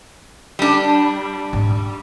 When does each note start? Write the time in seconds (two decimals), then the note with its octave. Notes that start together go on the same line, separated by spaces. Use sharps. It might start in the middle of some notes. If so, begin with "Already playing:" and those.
0.59 G3 D4
1.53 G#2 D#4